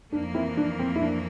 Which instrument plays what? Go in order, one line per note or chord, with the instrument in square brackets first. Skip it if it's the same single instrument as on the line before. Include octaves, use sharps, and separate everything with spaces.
[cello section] F2 E3 A#3 [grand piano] D4
[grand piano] C4 E4
D4
C4
E4
D4